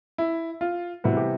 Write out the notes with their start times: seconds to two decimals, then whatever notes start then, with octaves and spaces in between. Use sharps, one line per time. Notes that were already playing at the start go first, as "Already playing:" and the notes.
0.18 E4
0.61 F4
1.04 C3 E3 G3 B3 F#4
1.17 G4